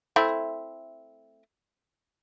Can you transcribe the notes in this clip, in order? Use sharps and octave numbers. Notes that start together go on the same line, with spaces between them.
A3 C4 E4